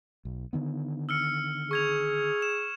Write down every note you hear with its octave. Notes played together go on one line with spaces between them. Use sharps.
B1
D3 D#3 B3
E6 F6 C#7
G#4 C#6 G#6 F7
E7